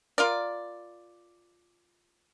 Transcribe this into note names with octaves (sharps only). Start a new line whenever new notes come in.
F4 A#4 D5